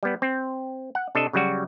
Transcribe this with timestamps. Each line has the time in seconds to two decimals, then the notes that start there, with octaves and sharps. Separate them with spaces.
0.03 G3 B3
0.22 C4
0.95 F#5
1.15 C3 D4 A4 D#5
1.33 C#3 F#3 G3 F#4